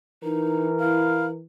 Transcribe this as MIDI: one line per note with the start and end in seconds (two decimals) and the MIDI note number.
0.23 1.44 52
0.23 0.67 63
0.23 1.37 70
0.80 1.25 64
0.80 1.26 77